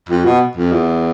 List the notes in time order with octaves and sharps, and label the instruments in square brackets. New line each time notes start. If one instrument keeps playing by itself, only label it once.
[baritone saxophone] F2
B2
F2
E2